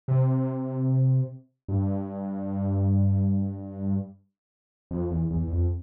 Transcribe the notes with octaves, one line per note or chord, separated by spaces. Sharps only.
C3
G2
F2
E2
E2
E2
F2